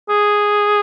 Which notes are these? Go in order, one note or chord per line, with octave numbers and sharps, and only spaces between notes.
G#4